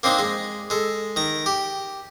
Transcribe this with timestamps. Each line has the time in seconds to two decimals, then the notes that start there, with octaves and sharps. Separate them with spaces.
0.03 A#3 C4 D4 D#4
0.19 G#3
0.70 G#3 A4
1.16 D#3 A#5
1.46 G4